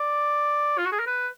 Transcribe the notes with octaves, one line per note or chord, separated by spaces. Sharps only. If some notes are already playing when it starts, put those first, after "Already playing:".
Already playing: D5
F4
F#4
G#4
A#4
B4